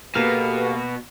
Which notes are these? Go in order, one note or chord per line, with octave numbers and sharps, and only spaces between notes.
B2 A#3 G4 A4 B4 F5